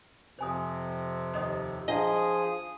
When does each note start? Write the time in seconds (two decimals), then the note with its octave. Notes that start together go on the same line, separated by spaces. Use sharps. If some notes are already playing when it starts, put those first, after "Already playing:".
0.39 F2 C3 C5 G#5 D#6
1.34 D#2 C5 D#5 D#6
1.88 F3 D4 E4 G#4 D#5 F#5 D#6